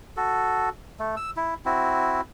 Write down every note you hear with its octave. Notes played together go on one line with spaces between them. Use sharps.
F#4 A4
A3
E6
E4
C4 E4 F#4